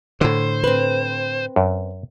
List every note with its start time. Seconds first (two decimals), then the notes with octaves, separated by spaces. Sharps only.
0.21 A2 D3 C5
0.64 C4 B4
1.56 F#2